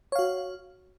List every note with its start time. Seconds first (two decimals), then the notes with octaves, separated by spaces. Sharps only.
0.12 C#5
0.15 F5
0.19 F#4